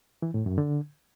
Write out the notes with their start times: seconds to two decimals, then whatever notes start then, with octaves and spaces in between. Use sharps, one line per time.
0.22 E3
0.34 A2
0.46 F#2
0.58 D3